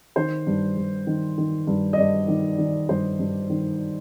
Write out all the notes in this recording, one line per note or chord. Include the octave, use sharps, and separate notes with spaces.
D#3 C5
G2
G2
D#3
D#3
G2
D#5
G2 D5
D#3
D#3
G2 C5
G2
D#3